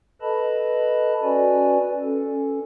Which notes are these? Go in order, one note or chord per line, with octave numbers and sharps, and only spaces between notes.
A4 B4 D#5 A5 B5
C#4 F#4 B4 D5 G#5
C#4 A4